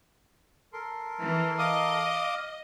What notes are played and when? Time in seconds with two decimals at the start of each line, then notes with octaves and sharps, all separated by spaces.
0.73 A4 A#4 C6
1.21 E3
1.59 D#5 F5 D6 D#6